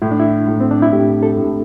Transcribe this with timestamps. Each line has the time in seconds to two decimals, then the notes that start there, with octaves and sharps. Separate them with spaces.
0.02 A2 E4
0.11 D4
0.20 E4
0.47 A2
0.61 C4
0.71 D4
0.82 E4
0.92 A2 G4
1.23 A4
1.37 A2